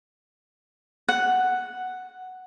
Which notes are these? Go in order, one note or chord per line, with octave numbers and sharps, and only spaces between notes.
F#5